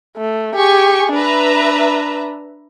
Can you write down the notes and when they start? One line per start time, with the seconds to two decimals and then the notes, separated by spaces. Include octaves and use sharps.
0.17 A3
0.55 G4 G#4 G#5 C#6
1.13 D4 B4 E5 A#5